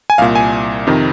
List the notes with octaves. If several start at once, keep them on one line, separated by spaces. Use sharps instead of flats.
G#5
C2 A#2 F5
G#5
F2 C3 D#3